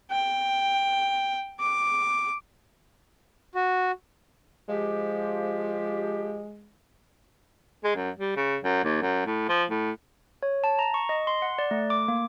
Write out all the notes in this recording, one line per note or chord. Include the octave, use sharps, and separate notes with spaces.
G5
D6
F#4
F3 G#3 G4
G#3
F#2
G3
C#3
F#2
D#2
F#2
A2
F3
A2
C#5
A5
A#5
C#6
D#5
C6
F#5
D5
A3
D6
A#3